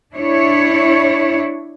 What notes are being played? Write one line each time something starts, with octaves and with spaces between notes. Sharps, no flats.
D4 E4 C#5